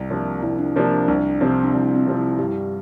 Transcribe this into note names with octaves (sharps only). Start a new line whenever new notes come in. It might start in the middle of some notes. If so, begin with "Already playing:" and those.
Already playing: C2
C3 F3 A#3 D4
C2 E4
D4
C3 F3 A#3 D4
D4
C2 D4
C3 F3 C4
D4
C2 E4
C4
C3 F3 C4
E4
G2 G4